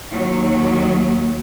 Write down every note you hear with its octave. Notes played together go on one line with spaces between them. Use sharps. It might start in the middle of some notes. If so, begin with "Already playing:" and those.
D#2 F#3